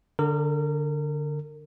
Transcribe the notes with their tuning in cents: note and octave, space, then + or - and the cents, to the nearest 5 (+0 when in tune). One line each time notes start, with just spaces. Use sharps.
D3 +0 A#4 -30